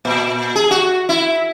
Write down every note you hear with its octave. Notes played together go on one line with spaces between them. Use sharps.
A#2
G#4
F#4
E4